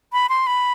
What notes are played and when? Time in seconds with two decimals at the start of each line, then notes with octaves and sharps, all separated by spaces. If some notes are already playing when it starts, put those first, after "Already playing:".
0.13 B5
0.29 C6
0.47 B5